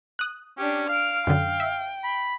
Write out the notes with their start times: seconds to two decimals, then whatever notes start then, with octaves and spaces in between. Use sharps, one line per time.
0.19 D#6 F#6
0.58 C#4 D4 G4
0.89 F5 F6 D7
1.27 F#2 D3 G5
1.60 E5
2.04 B5